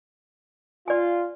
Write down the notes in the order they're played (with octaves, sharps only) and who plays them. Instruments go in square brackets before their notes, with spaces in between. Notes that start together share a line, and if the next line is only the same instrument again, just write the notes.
[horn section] F4 [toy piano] D5 G#5